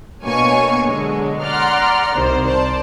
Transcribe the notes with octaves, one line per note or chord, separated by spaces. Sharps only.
B2 A#3 D4 C#5 G#5 C#6
D3 F#3 G#3
D5 F#5 A#5 C6 F6
C2 D#3 C5
C5 D5 A5